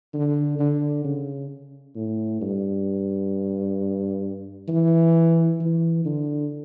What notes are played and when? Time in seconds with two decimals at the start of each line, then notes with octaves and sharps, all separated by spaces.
0.14 D3
0.59 D3
1.04 C#3
1.95 A2
2.41 G2
4.68 E3
5.60 E3
6.05 D3